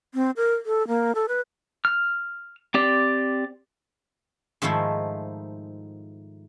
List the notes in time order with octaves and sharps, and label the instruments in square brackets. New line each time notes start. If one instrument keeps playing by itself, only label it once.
[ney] C4
A#4
A4
A#3
A4
B4
[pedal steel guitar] F6
C4 G4 D5
[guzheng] G#2 D#3 F3 A3 E4